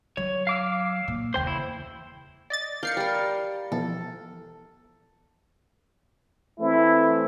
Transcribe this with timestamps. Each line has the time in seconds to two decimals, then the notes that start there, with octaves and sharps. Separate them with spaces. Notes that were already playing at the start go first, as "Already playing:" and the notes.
0.17 F#3 C#5
0.47 F5 D6 E6
1.08 A#2
1.34 F#1 E2 C5 G5
1.47 E4
2.50 D5 D#5 A6
2.83 A#4 D5 F5 G6 C7 C#7
2.97 G3 A#4
3.72 B2 E3 F3 A4
6.60 E3 A3 C4 E4